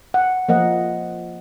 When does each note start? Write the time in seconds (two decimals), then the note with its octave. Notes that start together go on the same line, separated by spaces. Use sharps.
0.14 F#5
0.49 F3 A#3 D#5 F#5